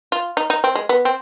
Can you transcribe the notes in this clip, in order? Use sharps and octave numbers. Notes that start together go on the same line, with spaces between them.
F4
D#4
D#4
C4
G#3
B3
C4